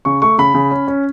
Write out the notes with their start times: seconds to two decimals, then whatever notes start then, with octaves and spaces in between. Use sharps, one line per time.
0.05 C#3 C#6
0.22 A3 C#6
0.38 C#3 B5
0.54 C#3
0.71 C#4
0.88 C#4